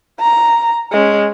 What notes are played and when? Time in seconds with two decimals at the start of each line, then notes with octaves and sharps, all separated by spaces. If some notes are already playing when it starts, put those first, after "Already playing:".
0.20 A#5
0.92 G#3 C#4